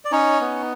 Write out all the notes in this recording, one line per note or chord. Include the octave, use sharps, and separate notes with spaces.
D5
C#4 D#4 C#5
B3